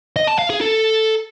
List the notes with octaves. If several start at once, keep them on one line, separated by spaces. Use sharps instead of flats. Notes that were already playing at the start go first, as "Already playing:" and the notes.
D#5
A5
F5
G#4
A4